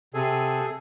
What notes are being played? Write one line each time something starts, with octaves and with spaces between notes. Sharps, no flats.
C3 G#4 A4